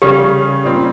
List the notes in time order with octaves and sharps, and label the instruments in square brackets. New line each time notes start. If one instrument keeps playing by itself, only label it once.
[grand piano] C#3 G3 C#4 [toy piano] G4
[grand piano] A#2 G3 C4